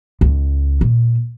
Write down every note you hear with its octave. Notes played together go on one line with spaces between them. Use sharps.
C#2
A#2